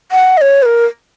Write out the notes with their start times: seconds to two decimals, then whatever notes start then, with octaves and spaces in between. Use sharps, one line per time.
0.12 F#5
0.37 D#5
0.41 C#5
0.62 B4
0.66 A#4